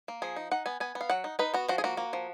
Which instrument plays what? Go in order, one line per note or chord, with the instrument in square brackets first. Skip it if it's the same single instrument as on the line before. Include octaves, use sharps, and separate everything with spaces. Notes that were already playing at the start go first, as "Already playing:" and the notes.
[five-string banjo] A#3
F3 G#4
D#4
D#4 F#5
B3 G#5
B3 G#5
B3
F5
F#3 F#5
D#4
D#4 B4
B3 F#4
F3 F#4
G#4
A#3 F#4
A#3
F3